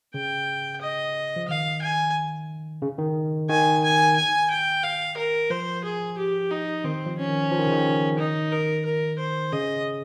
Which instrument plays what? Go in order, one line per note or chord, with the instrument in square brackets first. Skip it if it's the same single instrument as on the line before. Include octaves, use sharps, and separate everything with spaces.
[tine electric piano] C#3 [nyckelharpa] G5
[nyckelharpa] D#5
[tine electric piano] F3
[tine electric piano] D#3 [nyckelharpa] F5
[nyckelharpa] G#5
[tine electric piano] C#3
D#3
[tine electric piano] D#3 [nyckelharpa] G#5
[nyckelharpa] G#5
G#5
G5
F5
A#4
[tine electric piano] F3 [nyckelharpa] C5
[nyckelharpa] G#4
G4
D#4
[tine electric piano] D#3 [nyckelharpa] C4
[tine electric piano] F3
[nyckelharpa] C#4
[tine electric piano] D#3
F3
D#3
C#3
D#3
[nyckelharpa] D#4
A#4
A#4
C5
[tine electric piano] C#3 [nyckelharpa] D#5